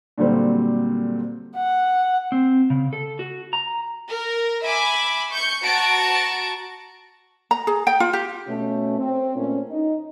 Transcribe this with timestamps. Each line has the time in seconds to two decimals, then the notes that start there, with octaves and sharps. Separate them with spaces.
0.18 A#2 D3 F#3 G3 C4
1.56 F#5
2.32 C4
2.70 C#3
2.93 A4
3.19 F#4
3.53 A#5
4.09 A#4
4.64 E5 G#5 B5 D6
5.31 C#6 G6 C#7
5.64 F#4 A5 A#5 C#6 D7
7.51 A#5
7.67 G#4
7.87 G5
8.00 F4
8.13 G4
8.48 B2 A3 C#4
8.99 C4
9.36 A#2 A3 C#4
9.70 D#4